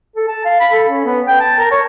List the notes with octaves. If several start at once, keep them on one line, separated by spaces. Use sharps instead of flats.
A4
A5
F5
B5
A4
C#4
B3
G5
A5
A#4
C#5